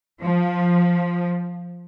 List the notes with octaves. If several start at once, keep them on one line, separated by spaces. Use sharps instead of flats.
F3